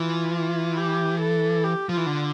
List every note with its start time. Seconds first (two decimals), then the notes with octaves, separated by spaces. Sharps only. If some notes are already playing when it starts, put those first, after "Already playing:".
Already playing: E3 F4
0.77 G4
1.20 A4
1.63 G4
1.89 F3 F4
1.97 E3
2.07 D3